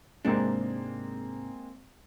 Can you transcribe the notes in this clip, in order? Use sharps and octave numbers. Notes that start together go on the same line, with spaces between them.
G#2 C3 G#3 A#3 C4 D4